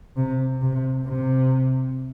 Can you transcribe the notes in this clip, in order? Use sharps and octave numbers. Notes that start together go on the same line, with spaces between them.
C3
C3
C3